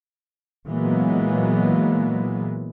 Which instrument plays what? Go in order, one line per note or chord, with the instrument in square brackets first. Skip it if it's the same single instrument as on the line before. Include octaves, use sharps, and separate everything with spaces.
[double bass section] A#2 E3 F#3 G#3 A#3 B3